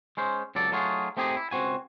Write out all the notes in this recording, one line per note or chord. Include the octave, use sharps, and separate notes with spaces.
G#3 C#4 C5
C#2 F#3 A4 D5
F#3 A3 D#4 F4 F#4 G#4
A3 C4 D#4 G4 G#4
E4
C#2 C4 F#4 G#5